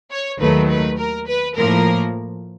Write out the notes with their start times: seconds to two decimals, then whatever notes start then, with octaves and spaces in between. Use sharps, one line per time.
0.11 C#5
0.40 D#2 D#3 F#3 A3 B4
0.69 B4
0.98 A#4
1.28 B4
1.56 A2 F3 A#3 A#4